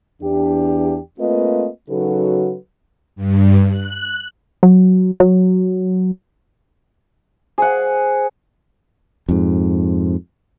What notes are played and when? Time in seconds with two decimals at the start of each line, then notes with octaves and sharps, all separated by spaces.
0.22 E2 D4 G4
1.19 A3 A#3 C4 F4 B4 D#5
1.89 C#3 F#3 D#4 F#4 A4 B4
3.16 G2
3.70 F#6
4.63 F#3
5.20 F#3
7.58 G#4 C5 F#5
9.29 F2 G#2